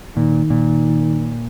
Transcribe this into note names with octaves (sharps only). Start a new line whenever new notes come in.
A#2 D#3
A#2